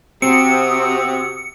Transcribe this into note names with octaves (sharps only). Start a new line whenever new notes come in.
C3 C4 F#4 D#6 E6 C#7